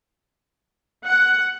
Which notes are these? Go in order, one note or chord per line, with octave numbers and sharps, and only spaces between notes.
F#5